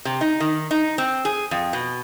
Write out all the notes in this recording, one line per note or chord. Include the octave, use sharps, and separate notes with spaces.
C3
D#4
D#3
D#4
C4
G#4
F2
B2